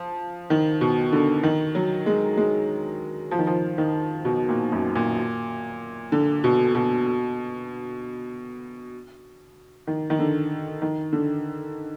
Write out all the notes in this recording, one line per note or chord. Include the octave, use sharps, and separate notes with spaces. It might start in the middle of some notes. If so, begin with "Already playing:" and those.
Already playing: F3
D#3
B2
D3
D#3
F#3
G#3
G#3
F3
D#3
F3
D#3
B2
A#2
F#2
A#2
D3
B2
B2
D#3
D#3
D3
D#3
D3